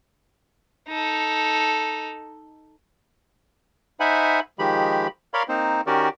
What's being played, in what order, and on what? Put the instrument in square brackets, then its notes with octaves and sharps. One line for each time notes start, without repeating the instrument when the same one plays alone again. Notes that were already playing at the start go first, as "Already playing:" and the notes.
[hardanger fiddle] D#4 A4
[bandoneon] D#4 C5 E5 F#5 G#5 B5
D#3 F3 G#3 G4 B5
A#4 C#5 D5 F5 B5 C6
A#3 C4 D#4 C5
D#3 C#4 F#4 G4 A#4 D5